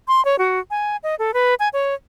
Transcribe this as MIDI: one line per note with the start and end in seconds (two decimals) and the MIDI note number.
0.08 0.23 84
0.25 0.36 73
0.39 0.60 66
0.70 0.97 80
1.03 1.15 75
1.19 1.34 69
1.34 1.55 71
1.60 1.69 80
1.73 1.94 73